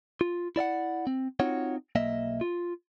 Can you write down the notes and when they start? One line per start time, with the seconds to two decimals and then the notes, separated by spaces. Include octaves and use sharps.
0.21 F4
0.56 E4 D5 E5 F#5
1.07 C4
1.40 C4 D#4 F4 F#4 C#5 F#5
1.95 B1 A#3 D#5 E5
2.41 F4